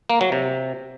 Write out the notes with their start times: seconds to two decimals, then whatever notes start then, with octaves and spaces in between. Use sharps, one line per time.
0.10 A#3
0.21 F#3
0.32 C3